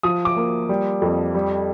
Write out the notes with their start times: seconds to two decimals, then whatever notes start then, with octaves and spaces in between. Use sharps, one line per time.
0.03 F3 D#6
0.25 D6
0.37 A#3
0.69 G3
1.02 F2
1.35 G3